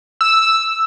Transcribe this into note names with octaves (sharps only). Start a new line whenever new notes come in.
E6